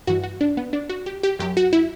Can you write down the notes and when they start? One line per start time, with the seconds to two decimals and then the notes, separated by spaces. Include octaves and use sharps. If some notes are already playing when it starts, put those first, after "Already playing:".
0.07 G2 E3 F#4
0.24 F#4
0.41 D4
0.57 B3
0.73 D4
0.89 F#4
1.06 G4
1.23 G4
1.39 F#2 F#3 G4
1.57 F#4
1.73 E4